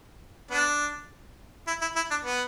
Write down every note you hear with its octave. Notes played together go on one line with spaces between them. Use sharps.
B3 D4
E4
E4
E4
D4
B3